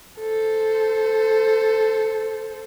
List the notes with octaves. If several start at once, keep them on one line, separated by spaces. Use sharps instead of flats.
A4 C5